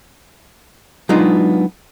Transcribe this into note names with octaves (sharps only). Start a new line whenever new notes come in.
F#3 G#3 B3 D4 D#4 F4